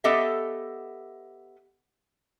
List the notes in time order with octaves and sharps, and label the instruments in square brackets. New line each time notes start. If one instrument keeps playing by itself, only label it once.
[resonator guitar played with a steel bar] B3 G4 A4 D#5 E5